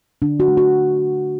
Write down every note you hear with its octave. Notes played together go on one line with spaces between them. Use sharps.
D3 D4
F#4
A3
F#4